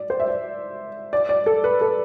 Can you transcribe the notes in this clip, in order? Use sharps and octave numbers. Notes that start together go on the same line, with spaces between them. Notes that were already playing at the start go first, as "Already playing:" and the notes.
Already playing: D5
C5
E5
D5
D5
D5
A4
B4
A4